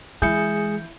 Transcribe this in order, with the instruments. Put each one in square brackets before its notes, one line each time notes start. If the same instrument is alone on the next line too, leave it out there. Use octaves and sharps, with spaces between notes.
[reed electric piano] E3 G6 [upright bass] G#3 [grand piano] E4 [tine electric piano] G#4 C#7